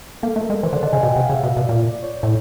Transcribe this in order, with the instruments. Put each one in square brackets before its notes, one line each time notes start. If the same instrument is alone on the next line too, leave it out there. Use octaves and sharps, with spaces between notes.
[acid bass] A#3 [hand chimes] A4
[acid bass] A3
[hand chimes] A#4
[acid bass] G#3
[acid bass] E3 [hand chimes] C5
[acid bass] D3 [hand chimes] D5
[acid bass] D3 [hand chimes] D#5
[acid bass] C#3 [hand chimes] G#5
[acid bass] B2 [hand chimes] G5
[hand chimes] F#5
[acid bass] C3
[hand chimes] F5
[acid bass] C#3
[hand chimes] E5
[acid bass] B2
B2
[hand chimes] D5
[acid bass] A#2
[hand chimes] D5
C#5
[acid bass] A2